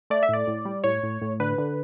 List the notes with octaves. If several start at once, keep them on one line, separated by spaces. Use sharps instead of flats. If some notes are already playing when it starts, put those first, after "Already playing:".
A3 D5
E5
A2 D5
A2
G3
A2 C#5
A2
A2
D3 B4
D3